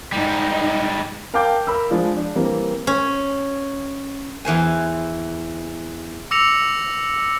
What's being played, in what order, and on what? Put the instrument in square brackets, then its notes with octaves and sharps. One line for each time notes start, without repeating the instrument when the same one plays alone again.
[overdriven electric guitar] G#2 G3 [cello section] D#4
[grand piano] A#4 F5 G5 A5 D6 G6
A#4 B5 E6
F3 G#3 D4 F4
D4
E3 G3 A#3 C4
[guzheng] C#4
E2 E3 C5 G#5
[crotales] D6 E6 A#6 C#7 F7